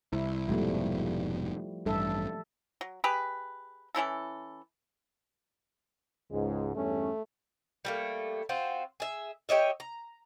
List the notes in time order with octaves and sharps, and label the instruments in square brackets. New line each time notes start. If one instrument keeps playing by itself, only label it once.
[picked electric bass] C2 [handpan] E4
[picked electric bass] F1 G#2 B2 [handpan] F3 G3 A3
[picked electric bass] A1 G2 [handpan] A4 E5
[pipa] F#3
G4 G#4 B4
E3 C#4 E4 A4
[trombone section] C#2 G#2 [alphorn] G#3
[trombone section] E2 G2 C#4 [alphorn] A3
[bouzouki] G3 A3 A#3
C4 F4 F#4 C5
G#4 E5
G4 C#5 D#5 E5
A#5